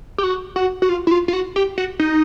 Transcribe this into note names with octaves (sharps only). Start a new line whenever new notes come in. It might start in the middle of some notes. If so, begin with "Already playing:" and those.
G4
F#4
F#4
F#4
F4
E4
F4
F4
F#4
G4
F#4
D#4